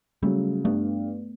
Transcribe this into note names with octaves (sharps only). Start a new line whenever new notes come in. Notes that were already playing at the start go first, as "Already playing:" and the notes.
C#3 F#3 G3 A3
G2 A3 B3